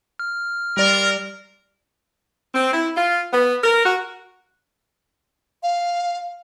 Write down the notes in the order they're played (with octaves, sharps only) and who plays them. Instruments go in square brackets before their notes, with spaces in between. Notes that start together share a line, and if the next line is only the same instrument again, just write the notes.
[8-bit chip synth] F6
[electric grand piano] G3 D5 [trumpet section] F4 A#4
[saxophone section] C4
E4
F4
B3
A#4
F#4
[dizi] F5